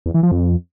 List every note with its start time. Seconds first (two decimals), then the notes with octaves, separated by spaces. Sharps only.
0.06 E2
0.14 E3
0.23 F3
0.32 F2